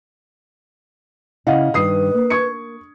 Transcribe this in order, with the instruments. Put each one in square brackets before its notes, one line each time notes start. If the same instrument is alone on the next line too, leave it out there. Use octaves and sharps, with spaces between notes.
[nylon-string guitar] C#3 E4 [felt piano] D#5 F5 F#5
[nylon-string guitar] G2 D#3 [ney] B4 [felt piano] D#6 C7
[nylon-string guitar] A#3
[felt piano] C#6 G#6 C#7